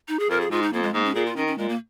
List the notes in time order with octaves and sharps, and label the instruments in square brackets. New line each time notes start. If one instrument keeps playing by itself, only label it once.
[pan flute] D#4
G#4
[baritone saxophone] F2 [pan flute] A#4
[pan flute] G#4
[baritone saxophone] G#2 [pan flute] F4
[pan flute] D#4
[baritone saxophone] F2 [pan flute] A#3
[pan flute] G#3
[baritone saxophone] G#2 [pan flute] A#3
[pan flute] C#4
[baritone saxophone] A#2 [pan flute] G#4
[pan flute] F4
[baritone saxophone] D#3 [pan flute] C#4
[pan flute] C#4
[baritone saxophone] A#2 [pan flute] G#3
[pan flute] A#3